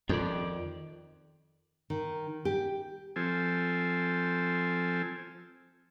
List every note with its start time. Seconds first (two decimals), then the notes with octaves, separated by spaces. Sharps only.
0.09 F2 D#3 D5
1.90 D#3
2.45 G4
3.16 F3 C4 A4 G#5